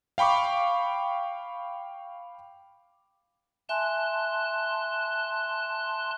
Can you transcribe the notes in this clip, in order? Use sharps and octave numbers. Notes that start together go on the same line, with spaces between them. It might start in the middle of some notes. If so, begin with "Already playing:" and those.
F5 G5 B5 C#6 D6
E5 G#5 A5 C6 F#6